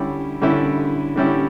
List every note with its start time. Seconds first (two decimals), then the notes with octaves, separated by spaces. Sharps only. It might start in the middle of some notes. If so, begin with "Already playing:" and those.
Already playing: D3 G3 C#4 E4 G4
0.42 D3 G3 C#4 E4 G4
1.16 D3 G3 C#4 E4 G4